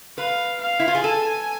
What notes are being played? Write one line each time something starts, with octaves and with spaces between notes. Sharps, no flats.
B4 F5
F5
E4
F4
G#4
A4 G#5